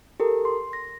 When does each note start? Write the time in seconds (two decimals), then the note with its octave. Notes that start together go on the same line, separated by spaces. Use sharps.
0.20 G4 A4 A#4
0.45 C6
0.73 A#6